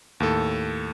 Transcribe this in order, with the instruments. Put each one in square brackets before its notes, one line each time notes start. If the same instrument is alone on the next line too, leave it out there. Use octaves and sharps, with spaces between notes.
[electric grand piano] D#2 A2 A4